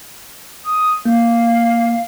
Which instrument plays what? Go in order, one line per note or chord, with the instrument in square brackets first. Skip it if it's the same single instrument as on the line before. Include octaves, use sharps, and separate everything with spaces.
[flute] D#6
[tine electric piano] A#3 [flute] F5